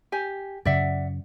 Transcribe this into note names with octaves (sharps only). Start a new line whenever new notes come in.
G4 G#5
F#2 C#3 D5 E5 F#5